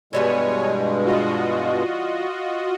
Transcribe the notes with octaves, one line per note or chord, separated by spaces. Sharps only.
G2 B2 E3 G3 G#3 B3 C#5 G#5
F4 F#4 D#5